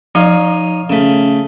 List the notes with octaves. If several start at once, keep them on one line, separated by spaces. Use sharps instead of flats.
F3 D#4 C#5 F5
C#3 A3